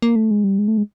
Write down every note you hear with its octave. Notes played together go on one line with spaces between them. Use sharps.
A#3
A3
G#3
G3
G#3
A3
G#3